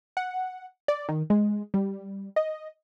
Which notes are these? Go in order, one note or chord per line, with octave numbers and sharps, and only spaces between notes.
F#5
D5
D#3
G#3
G3
D#5